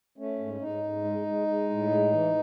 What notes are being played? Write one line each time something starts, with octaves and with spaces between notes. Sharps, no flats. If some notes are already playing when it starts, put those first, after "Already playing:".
A3 C#4
G#2
G#2 D#4
G#2
G#3
G#3
G#3
A2
G#3
E3